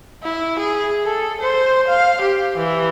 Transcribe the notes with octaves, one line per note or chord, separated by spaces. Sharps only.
E4
G#4
A4
C5
F5
G4
E3